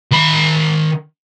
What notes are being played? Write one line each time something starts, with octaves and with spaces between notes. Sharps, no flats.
D#3 B5